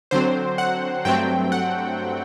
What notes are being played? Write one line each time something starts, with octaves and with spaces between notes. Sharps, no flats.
D3 F#3 C4 C5
F#5
G2 F#3 A3 C4 G5
F#5